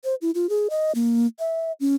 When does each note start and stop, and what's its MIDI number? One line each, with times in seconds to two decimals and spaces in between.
0.04 0.15 72
0.22 0.31 64
0.35 0.49 65
0.49 0.68 68
0.70 0.92 75
0.95 1.27 58
1.39 1.72 76
1.80 1.96 61